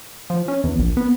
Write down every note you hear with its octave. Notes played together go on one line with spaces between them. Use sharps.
F3
C#4
E2
A#1
B3